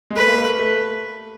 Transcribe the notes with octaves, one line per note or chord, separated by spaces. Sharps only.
G#3
A3 B4
A#3
A3
A3